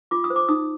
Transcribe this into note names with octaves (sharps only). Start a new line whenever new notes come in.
F4 D6
D#6
C5
D6
D#4 D#6